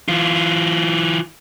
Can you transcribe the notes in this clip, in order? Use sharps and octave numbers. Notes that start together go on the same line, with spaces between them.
E3 F4